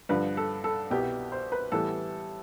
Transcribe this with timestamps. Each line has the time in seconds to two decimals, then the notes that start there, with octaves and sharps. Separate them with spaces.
0.09 G2 D3 F3 B4
0.37 A4
0.64 A4
0.90 C2 B2 B3 E4 G4
1.32 C5
1.52 B4
1.72 A2 E3 G3 B3 E4 A4